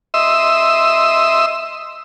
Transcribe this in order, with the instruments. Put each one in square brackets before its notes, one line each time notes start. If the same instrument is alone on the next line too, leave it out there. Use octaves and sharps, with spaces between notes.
[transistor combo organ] D#5 E5 C6 E6